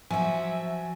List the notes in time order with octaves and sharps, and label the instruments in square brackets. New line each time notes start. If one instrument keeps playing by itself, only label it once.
[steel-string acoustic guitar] F3 F#4 [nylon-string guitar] F#3 [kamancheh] E5 [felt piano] G#5